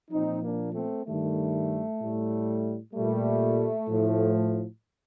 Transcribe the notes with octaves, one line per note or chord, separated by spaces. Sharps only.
A#2 F3 C4 D#4
A#3 D4
A3 C4
G2 D#3 G3 A3
A2 G3
A#2 G3 A3
A2 F3